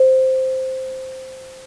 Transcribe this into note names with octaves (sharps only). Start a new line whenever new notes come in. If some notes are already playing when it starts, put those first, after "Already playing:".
Already playing: C5